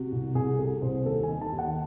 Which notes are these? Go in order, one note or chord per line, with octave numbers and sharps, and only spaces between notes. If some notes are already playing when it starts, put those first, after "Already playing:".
Already playing: C3 F#4
C2
C2 G#4
C3 A4
C2 C5
D#2 A4
G#5
D#3
A5
D#2
F#5